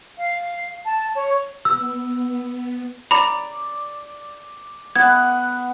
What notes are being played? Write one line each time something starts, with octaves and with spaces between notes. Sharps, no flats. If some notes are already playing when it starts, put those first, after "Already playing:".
F5
A5
C#5
B3 E6
D5 A#5 B5
B3 F#5 G#6